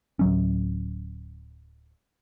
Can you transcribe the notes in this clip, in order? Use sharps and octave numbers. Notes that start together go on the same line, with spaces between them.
D1 F#3 C#4